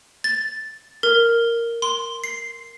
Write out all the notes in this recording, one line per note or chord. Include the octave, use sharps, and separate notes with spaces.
A6
A#4
C6
C7